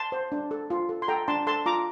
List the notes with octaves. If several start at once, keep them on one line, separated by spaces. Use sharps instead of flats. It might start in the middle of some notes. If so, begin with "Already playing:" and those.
Already playing: A5 C6
C5
D4
A4
F4
A4
C6
A4 G5 A#5
D4 A5 C6
A4 A5 C6
F4 A#5 D6